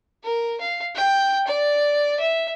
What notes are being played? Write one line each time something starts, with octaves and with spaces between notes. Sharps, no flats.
A#4
F5
G5
D5
E5